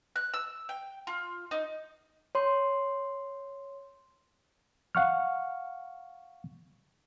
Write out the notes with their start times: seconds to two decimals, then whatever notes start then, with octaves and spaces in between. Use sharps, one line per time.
0.16 F#6
0.33 E6
0.69 G5
1.07 F4
1.51 D#4
2.35 C#5 C6
4.95 F5 F#5 C#6 F6